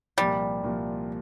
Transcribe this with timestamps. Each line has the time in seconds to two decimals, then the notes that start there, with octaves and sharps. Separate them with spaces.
0.18 C2 A#2 F3 G3
0.63 C2 A#2 F3